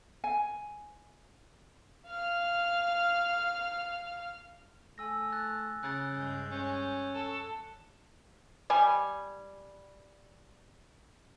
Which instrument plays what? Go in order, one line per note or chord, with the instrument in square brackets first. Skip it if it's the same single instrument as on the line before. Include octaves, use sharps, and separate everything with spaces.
[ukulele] G#5
[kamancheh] F5 F6
[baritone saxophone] A3 [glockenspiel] G#5 E6 A#6
[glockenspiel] F#6 A6
[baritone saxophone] C#3 [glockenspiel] F#6 A6
[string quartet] G2 G#3 G6
[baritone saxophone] C#4
[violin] A4
[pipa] G3 G#5